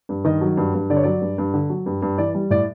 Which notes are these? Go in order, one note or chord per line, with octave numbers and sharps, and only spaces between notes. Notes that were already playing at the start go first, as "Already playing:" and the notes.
G2
D#3 D#5
F#3
G2
G2
D3 D5
C#5
F#3 D5
G2
G2
D3
F#3
G2
G2
E3 D5
G3
A2 D5